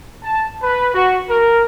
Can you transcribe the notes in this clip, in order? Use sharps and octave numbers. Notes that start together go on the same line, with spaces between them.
A5
B4
F#4
A#4